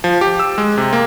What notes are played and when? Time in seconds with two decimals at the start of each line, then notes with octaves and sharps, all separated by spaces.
0.04 F3
0.21 G4
0.39 E6
0.58 G#3
0.78 C3
0.93 A#3